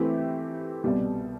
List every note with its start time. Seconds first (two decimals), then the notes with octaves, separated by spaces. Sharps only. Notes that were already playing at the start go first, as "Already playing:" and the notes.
Already playing: E3 A3 C4 E4 G4
0.84 C2 B2 G3